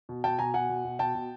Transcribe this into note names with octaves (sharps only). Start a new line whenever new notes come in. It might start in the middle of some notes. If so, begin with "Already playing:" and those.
B2
B2 G5 A5
B2 G#5 A#5
B2 F#5 G#5
B2
B2
B2 G5 A5
B2